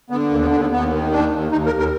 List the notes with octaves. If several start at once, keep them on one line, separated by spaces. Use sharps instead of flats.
D3 B3
D#2 A#3
B3
D#2 D4
B3
D#2 B3
D#3
D#2 D4
D#2
D#2 D#4
A#4
D#2
A#4